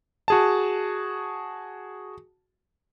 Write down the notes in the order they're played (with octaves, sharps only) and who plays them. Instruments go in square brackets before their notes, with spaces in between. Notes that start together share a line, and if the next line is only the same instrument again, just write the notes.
[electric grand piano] F#4 G#4 A5